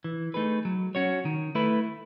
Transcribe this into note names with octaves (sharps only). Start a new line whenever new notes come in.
E3
A3 D#4 G#4 B4
F#3
C#4 F#4 C#5
D#3
A3 E4 B4